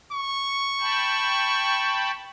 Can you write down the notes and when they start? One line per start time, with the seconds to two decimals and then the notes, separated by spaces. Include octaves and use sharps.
0.12 C#6
0.80 G5 A5 B5